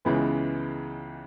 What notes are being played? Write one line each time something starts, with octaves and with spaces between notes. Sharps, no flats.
C#2 C#3 E3 G#3 B3